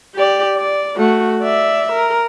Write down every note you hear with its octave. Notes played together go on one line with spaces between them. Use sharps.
G4 D5
D5
A3 F#4
D5 E5
A#4